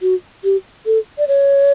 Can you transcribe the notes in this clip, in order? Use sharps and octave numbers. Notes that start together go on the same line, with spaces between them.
F#4
G4
A4
D5
C#5